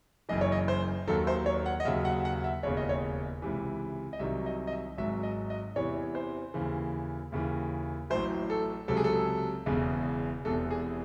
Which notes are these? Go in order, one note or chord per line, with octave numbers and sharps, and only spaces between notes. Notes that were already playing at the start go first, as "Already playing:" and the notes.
F#1 F#2 E3 D#5
C#5
D#5
C5
D#2 D#3 F#3 A4
C5
C#5
F#5
D#5
D#2 C#3 F#3 E5
F#5
F#5
E5
E1 D#2 C#3 C#5
D#5
C#5
C#2 C3 E3
D#5
C2 C3 D#3 F#3 E5
D#5
D#5
E5
G#1 G#2 F#3 E5
D#5
D#5
E2 C3 E3 C#5
C5
D#2 C#3 E3
D#2 C#3 E3
A1 A2 F#3 C5
A4
C#2 C3 F#3 A4
G#4
A4
E1 E2 C#3
E1 E2 C3 A4
G#4